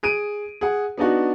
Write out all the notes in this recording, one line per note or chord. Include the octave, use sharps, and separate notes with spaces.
G#4 D7 D#7
G#4 F#5
B3 D4 D#4 F#4